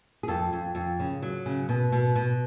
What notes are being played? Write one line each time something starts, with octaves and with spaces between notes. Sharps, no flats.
G#4
F2 A4
F2
F2
C#3
F#3
C#3
B2
B2
B2